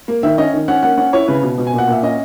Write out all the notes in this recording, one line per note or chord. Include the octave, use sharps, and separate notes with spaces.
A#3
D#3 E5
C#4 D#5
D#3
C#4 F#5
A#3 F#5
C#4 F#5
E4 C#5
C#3 B4
B2
B2
G#5
A#2
F#5
A#2 E5
C#4 D#5